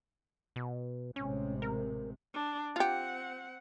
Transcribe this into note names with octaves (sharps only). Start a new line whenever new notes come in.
B2
A1 C3 G#3 C#4
A#4
D4
C4 F4 G4 F#5